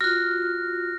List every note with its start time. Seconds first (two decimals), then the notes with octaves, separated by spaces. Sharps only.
0.01 F4 F#4 F6 F#6 A#6